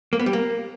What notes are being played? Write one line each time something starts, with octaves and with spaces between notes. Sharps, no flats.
A#3
B3
G3
A#3